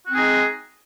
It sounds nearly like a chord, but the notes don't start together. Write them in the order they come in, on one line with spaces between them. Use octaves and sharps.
F#4 C4 G#4 D#4 G#3